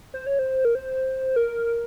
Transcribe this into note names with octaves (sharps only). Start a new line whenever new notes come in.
C5
C#5
C5
A#4
C5
A#4